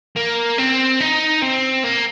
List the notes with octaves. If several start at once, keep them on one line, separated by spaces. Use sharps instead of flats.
A#3
C4
D#4
C4
A#3